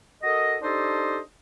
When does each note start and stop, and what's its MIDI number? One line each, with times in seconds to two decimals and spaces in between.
0.23 0.56 66
0.23 0.56 69
0.23 0.56 70
0.23 0.56 75
0.62 1.19 62
0.62 1.19 63
0.62 1.19 67
0.62 1.19 69
0.62 1.19 72
0.62 1.19 75